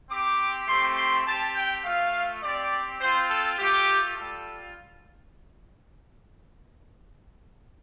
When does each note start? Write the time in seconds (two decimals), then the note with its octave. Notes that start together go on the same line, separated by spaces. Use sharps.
0.11 C4 G4 D6
0.68 A3 C4 G4 C6
0.97 C6
1.26 C4 G4 A5
1.55 G5
1.84 A3 F4 F5
2.43 C4 G4 D5
3.00 C4 F4 C5
3.30 A4
3.58 A3 F4 G4
4.16 G3 F4 A4